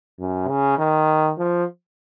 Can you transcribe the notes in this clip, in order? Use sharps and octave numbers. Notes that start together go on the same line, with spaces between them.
F#2
C#3
D#3
F3